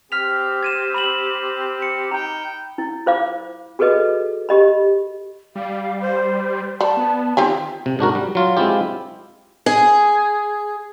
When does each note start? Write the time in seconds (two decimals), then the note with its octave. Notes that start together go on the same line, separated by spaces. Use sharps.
0.12 C4 G4 F6 B6 F7
0.63 G#6 D#7 E7
0.94 B5 E7 F#7
1.82 C#7
2.11 D#4 G5 A#5
2.78 E4
3.06 F4 C5 F5 D6
3.79 F#4 G#4 A4 B4 D#5
4.49 G4 D#5 B5
5.55 G3 F5
6.01 C5
6.81 G3 A5
6.97 B3
7.37 D#3 C4 F4 G4 G#5
7.86 C3
7.99 G#2 D4 F#4 A#4
8.15 G3
8.35 F#3 F4
8.57 G#3 C4 E4 F4 G4
9.66 G#4